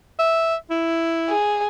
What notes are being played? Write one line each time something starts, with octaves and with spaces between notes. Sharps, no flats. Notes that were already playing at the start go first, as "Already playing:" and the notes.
E5
E4
G#4